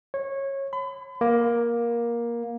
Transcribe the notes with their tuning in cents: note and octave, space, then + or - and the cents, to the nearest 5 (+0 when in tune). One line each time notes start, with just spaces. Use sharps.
C#5 -20
B5 +35
A#3 +15